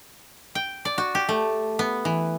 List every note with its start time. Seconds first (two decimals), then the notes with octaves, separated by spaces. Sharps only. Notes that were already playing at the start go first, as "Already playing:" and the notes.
0.55 G5
0.85 D5
0.98 F#4
1.15 G4
1.29 A3
1.79 B3
2.05 E3